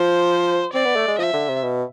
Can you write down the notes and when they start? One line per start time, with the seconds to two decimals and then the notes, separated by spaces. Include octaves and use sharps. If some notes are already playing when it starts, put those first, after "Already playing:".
Already playing: F3 C5
0.73 C4 D5
0.85 B3
0.96 A3
1.08 G#3
1.19 F3 E5
1.34 D3
1.49 C3
1.63 B2